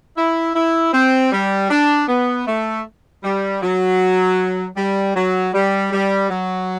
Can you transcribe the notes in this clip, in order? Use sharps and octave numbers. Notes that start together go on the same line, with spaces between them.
E4
E4
C4
G3
D4
B3
A3
G3
F#3
G3
F#3
G3
G3
F#3